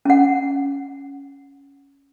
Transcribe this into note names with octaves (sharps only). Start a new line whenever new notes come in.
C#4 F#5